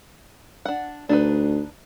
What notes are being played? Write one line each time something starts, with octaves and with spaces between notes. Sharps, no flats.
D4 F#5
D2 D4 D#4 B4